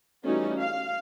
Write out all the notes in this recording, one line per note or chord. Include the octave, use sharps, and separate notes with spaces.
E3 G3 A3 C#4 D#4 F#4
F5